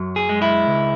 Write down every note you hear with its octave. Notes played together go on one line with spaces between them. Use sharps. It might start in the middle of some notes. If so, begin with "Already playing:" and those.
Already playing: F#2 F#3
G#4
G#3
E4
C#2